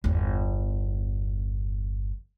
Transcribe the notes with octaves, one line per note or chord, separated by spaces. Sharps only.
G1 E2